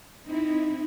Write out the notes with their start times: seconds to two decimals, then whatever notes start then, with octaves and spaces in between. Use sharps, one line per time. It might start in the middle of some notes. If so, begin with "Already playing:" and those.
0.25 C4 D#4 E4